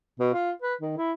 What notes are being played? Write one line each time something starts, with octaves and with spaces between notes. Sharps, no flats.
B2
F4
B4
D#3
E4